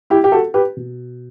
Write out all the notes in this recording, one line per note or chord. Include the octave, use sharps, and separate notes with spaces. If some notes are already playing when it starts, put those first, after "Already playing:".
E4 G4
G4
F#4 A4
G4 B4
B2